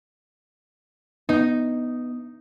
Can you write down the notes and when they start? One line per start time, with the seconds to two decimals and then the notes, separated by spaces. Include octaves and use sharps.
1.29 B3 D#4